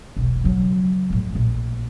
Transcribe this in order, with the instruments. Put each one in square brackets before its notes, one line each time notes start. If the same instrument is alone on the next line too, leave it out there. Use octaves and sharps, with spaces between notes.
[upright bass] E1 B1
C#3 F#3
F2 A2
A#1